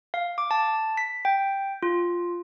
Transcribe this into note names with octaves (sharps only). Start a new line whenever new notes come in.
F5
D6
A5
B6
G5
F4